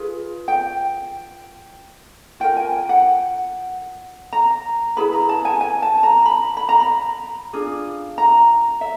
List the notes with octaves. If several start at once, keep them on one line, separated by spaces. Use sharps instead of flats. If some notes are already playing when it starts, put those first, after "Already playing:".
Already playing: F4 G#4 B4
G5
F4 A#4 G5
G#5
G5
F#5
A#5
E4 G#4 B4 B5
A#5
A5
G#5
G#5
A5
A#5
B5
B5
A#5
B5
D4 F4 G#4
A#5
E5